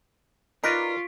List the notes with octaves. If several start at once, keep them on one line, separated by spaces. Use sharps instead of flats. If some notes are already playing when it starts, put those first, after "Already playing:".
D#4 F4 A#4 B4 D5 C#6 B6 D7